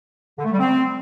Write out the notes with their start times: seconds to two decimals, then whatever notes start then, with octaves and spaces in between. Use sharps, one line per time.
0.38 D3
0.45 A3
0.52 G3
0.59 C4